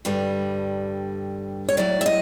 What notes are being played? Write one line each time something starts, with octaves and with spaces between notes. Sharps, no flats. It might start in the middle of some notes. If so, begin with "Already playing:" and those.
G2 D3 G3
C#5
A2 F#3 D5
E5
D#5